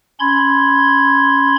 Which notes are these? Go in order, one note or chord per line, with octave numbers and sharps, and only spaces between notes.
C#4 B5 C6 G#6